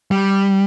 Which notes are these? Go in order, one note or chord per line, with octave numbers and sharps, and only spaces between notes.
G3